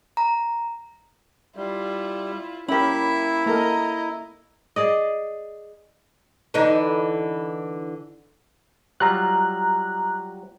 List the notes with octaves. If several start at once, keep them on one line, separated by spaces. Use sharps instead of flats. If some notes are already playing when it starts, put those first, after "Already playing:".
A#5
G3 E4 F4
A#3 C#4 E4 G4 A#4 E5 B5
A#3 A4 A#4 D#5 A#5
G#4 D5 D#5
D3 E3 D#4
F#3 G3 F4 A#5 F#6